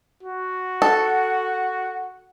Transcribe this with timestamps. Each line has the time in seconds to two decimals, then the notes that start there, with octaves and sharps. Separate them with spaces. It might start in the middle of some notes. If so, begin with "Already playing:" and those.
0.24 F#4
0.82 A4 F#5